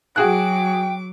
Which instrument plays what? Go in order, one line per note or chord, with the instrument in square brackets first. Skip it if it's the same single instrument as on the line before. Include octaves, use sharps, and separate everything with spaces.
[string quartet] F#3 D6 [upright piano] F#4 G#4 F#6 [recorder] G5